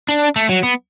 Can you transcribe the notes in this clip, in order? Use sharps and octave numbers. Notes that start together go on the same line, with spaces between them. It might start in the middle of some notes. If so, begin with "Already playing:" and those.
D4
A3
F#3
B3